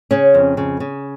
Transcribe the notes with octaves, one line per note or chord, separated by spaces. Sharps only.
C#3 C#4
F2
C#3
C#3